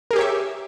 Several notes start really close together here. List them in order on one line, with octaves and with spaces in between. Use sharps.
A#4 G#4 G4 C#5 E5